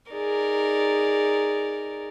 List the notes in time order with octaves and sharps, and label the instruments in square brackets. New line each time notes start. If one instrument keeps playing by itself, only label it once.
[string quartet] D#4 G#4 A#4 D5